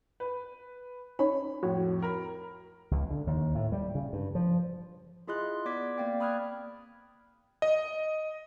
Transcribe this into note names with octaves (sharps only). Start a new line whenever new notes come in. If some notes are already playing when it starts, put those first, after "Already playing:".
B4
C#4 D#4 C#5 B5
F2 A2 F#4 C#5
A#4 A#5 B5
C#2
D3
D#2
A2
G3
C#3
G2
F3
E4 F4 G#4 D#5 C6 F#6
B3 D5 D6 G#6 B6
A#3 C4 D5 F5 G5
B5 D#6 F6 F#6 G#6
D#5